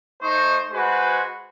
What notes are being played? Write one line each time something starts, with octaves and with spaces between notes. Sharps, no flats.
A3 D#4 C5 C#6
G#3 F#4 B4 C5